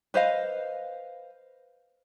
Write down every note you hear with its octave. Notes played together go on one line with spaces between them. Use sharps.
B4 C5 D#5 F5